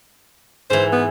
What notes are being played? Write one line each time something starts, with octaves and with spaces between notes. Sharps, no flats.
G#2 E3 C5
B3